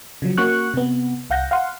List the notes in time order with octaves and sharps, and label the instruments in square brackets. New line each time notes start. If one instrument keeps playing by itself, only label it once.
[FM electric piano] C#3 F3 F#3
A#3 C#4 F#4 C#6 F#6
C3 B3
C2 F5 F#5 G6 A#6
F5 F#5 C6